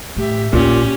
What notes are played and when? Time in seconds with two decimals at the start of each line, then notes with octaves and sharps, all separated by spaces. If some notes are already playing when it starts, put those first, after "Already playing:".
0.16 A2 G4 E5
0.53 A#1 D#2 A#2 C#4 G4